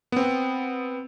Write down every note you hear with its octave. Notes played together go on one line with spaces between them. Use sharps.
B3 C4